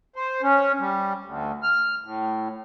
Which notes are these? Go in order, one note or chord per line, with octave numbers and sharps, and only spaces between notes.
C5
C#4
G3
D2
F6
A2